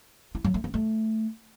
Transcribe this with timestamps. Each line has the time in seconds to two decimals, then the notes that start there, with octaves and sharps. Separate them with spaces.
0.35 E4
0.44 F#3
0.54 A3
0.64 B3
0.74 A3